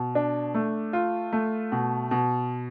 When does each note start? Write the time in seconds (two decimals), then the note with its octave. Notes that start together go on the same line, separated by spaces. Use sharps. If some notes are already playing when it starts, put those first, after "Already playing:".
Already playing: B2
0.15 D4
0.54 A3
0.93 F4
1.32 A3
1.72 B2
2.11 B2